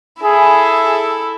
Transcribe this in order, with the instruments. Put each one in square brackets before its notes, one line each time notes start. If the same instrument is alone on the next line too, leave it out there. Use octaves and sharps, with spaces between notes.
[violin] E4 A4 [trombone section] G#4